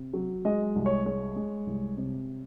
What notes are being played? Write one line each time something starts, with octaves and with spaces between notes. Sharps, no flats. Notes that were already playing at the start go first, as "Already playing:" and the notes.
Already playing: C3
F#3
G#3 D#5
C2
C#5
G#3 C#5
G#3
C2
C3